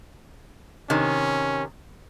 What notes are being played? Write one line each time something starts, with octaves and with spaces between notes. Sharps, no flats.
C3 D#3 C#4